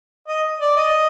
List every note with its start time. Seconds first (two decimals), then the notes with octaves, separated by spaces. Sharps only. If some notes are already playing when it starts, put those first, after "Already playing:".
0.28 D#5
0.60 D5
0.77 D#5